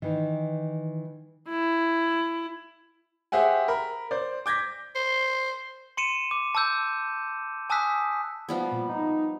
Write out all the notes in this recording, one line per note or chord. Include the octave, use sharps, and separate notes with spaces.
D#3 E3
E4
G4 G#4 C5 E5 F#5 G#5
A#4 B5
C5 D5
D6 G6 G#6 A#6 B6
C5
C6 C#7 D#7 E7
D6
A5 D6 E6 G6
G#5 A5 D#6 E6 F#6 B6
F3 G3 B3
A#2
D#4